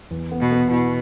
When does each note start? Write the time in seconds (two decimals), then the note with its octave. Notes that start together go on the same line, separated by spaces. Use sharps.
0.11 E2
0.31 B3
0.40 B2
0.51 B3
0.70 B2 E4